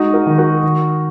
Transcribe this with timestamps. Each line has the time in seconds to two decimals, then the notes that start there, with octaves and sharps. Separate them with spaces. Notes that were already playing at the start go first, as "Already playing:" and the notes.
Already playing: G#3 D#4 F#4
0.14 F#4 A#4
0.26 D#3
0.38 F#4 A#4
0.63 D#3